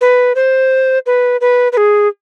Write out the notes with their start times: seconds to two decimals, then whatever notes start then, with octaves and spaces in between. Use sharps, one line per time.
0.01 B4
0.35 C5
1.06 B4
1.41 B4
1.72 B4
1.77 G#4